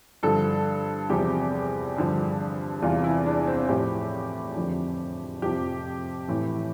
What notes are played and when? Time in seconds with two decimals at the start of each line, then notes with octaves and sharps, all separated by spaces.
0.23 G2 D3 F3 A4
1.10 E2 C3 F3 G4
1.96 G2 D3 F3
2.82 E2 C3 E3 F4
3.04 E4
3.26 D4
3.47 C4
3.69 A2 F3 G4
4.56 F2 D3 F3
5.42 F2 C3 F3 G4
6.28 A2 E3